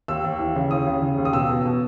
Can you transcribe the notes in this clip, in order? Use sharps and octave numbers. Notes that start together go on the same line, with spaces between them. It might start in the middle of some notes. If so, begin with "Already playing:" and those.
D#2 E6
D#2
E3
C#3
D#2 D#6
C#3
C#3
D#2
D#6
B2 E6
B2
B2